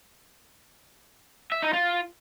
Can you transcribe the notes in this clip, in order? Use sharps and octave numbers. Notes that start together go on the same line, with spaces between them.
E5
D#4
F4